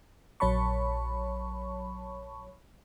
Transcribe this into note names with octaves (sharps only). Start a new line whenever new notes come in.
A#1 F#3 C#5 A5 B5 C#6